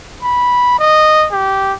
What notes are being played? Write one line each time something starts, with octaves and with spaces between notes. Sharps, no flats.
B5
D#5
G4